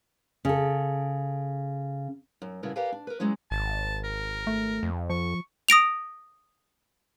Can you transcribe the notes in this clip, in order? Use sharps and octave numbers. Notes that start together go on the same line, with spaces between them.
C#3 A4
F#2
G2 C#3 E4 F#4 A#4
G4 A#4 B4 D5 F5 G#5
D4
A#4 B4
F#3 G#3 C#4 E4
G#1 A5
A#4
A3
F2
F3 C#6
D#6 A#6 D7 F7